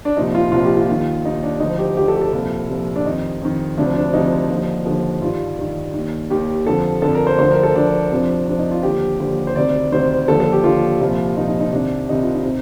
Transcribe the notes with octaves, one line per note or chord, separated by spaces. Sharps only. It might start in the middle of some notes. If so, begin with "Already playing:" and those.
D4
C2 A#2 F3 D#4
F4
C2 A#2 F3 F4
G4
F4
D#2 D#3
D#2 D#3 D#4
D4
D2 D3 F3 D#4
G4
D2 D3 F3 G4
A4
G4
A4
C2 A#2 F3
C2 A#2 F3
D4
F2 D#3 D#4
F2 D#3
D2 C3 F3 D4
D4
D2 C3 F3 D#4
D#2 D3 F3
D#2 D3 F3
G2 D#3 F4
G2 D#3
D#2 D#3
D#2 D#3 G4
F2 D3 F3 A4
F2 D3 F3 A4
A#4
C5
D2 D3 F3 C5
A#4
A4
D2 D3 F3 D4
F2 C3 F3
F2 C3 F3 D4
D#4
F4
D#2 D3 F3 G4
D#2 D3 F3
C5
D2 C3 D#3 D5
D2 C3 D#3 C5
D#2 D3 F3 A4
A4
G4
D#2 D3 F3 F4
C2 A#2 F3
C2 A#2 F3 D#4
D#4
D#4
C2 C3 D#3 D4
C2 C3 D#3 D#4
F4
D#4
C3